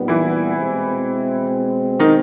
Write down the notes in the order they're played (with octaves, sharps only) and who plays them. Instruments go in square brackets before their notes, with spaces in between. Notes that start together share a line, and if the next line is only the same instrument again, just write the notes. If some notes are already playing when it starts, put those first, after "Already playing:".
Already playing: [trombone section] A#2 G3 B3 D#4
[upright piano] E3 E4
[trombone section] B2 G#3 C4
[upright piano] D#3 D#4